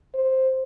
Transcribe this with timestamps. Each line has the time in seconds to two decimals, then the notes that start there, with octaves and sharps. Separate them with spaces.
0.14 C5